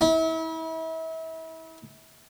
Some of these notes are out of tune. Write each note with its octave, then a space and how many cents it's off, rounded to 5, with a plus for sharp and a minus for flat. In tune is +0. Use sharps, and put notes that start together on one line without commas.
E4 -35